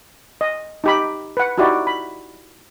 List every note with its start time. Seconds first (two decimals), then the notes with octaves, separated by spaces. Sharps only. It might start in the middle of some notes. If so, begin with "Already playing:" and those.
0.41 D#5
0.84 D#4 G4 B5
1.37 B4 F#5
1.58 D#4 E4 F#4 G4 D5
1.87 B5